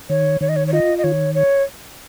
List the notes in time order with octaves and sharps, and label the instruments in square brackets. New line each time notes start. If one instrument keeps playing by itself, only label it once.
[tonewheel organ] D#3 [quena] C#5
[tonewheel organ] D#3 [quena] C#5
[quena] D#5
C#5
C#5
[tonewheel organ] F4 [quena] D#5
[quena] D#5
[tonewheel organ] D#3 [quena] C#5
[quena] C#5